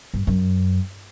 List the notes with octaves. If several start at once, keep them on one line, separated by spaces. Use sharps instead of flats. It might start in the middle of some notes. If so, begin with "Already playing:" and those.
G2
F#2